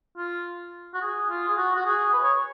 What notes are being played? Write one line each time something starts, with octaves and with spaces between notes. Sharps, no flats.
F4
F#4
G#4
F4
G#4
F#4
F#4
G#4
B4
D#5
C#5